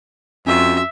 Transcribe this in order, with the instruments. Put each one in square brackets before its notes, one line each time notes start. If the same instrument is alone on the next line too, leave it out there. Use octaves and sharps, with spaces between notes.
[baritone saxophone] F2 [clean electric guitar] C#4 F#4 C6 [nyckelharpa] E5